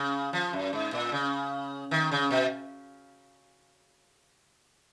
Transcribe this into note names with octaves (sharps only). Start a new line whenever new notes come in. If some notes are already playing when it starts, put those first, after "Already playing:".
Already playing: C#3
F3
F#2
G#2
A#2
C#3
D#3
C#3
B2